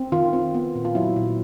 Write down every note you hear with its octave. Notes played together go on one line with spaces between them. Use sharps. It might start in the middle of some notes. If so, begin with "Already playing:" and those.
Already playing: C4
D#3 F4
C4
B3
A#2
F4
F#3 E4
A#2